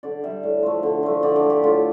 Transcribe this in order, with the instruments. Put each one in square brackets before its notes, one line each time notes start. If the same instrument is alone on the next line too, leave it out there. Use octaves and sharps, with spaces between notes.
[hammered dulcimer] D3 D5
G3 E5
A2
F3 A3
D3
F3 A3
D3 D5
D5
A3
G4
A2 F4